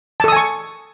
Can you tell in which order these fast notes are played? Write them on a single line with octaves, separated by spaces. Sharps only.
A5 A4 D#6 G#5 C#6